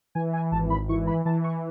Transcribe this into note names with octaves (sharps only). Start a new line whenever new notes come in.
E3 G#5
G#5
G#1 A5
B5
E3 C#6
B5
E3 A5
C#6